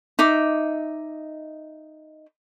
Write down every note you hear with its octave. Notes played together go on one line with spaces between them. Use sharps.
D#4 E5 D6